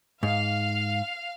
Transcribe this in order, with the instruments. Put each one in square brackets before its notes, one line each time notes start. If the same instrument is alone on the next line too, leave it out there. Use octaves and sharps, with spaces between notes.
[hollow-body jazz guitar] G#2 [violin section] F5